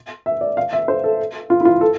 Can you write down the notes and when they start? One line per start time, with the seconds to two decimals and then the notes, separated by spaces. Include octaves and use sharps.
0.26 E5
0.41 D5
0.57 F5
0.73 E5
0.88 C5
1.04 A4
1.50 F4
1.60 E4
1.65 F4
1.81 A4